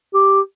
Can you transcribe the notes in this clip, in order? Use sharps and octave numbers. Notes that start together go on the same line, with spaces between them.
G4